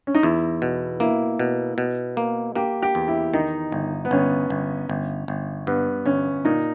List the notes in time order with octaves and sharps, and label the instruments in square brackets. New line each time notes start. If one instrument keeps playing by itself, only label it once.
[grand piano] C#4
D#4
[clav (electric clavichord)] E2 [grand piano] E4
[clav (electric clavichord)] B2
[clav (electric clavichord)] A#3 [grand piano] E4
[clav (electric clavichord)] B2
B2
A#3
[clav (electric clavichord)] A#3 [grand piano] G4
[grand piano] G4
[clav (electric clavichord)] E2
[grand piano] E4
[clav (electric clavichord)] D#3 [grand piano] D#4
[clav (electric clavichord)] G1
[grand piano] B3
[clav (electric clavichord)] G1 [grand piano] C#4
[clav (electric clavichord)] G1
G1
G1
[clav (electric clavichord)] G2 [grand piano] B3
[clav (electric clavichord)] G1 [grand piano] C#4
[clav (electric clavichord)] A#2 [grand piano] D#4